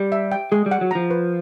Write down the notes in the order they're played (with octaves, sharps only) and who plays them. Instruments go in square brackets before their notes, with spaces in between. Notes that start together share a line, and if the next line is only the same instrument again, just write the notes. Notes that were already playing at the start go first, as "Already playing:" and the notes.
Already playing: [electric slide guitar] G3 [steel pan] G4
[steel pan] E5
G5
[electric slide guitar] G#3 [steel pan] G#4
[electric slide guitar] G3
[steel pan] F#5
[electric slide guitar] F#3
[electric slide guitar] F3 [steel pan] A#5
[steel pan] B4